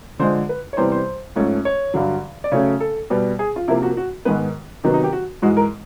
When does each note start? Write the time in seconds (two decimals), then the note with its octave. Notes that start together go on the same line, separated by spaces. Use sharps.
0.19 D3 F3 G#3 C5
0.49 B4
0.73 C#5
0.77 C3 E3 G3 B3 C5
0.92 C5
1.36 G#2 F3 A3 C#4
1.65 C#5
1.94 G2 D3 F#3
2.44 D5
2.52 C#3 F#3 A3 C#4 C#5
2.80 A4
3.10 B2 G3 B3
3.39 G#4
3.56 F4
3.68 C3 F3 A#3 E4
3.83 F#4
3.97 F#4
4.25 G#2 D#3 G#3 B3 B4
4.84 C3 D#3 F#3 B3 D#4
4.94 D#4
5.04 G4
5.13 F#4
5.42 G#2 E3 G#3 F#4
5.57 A#4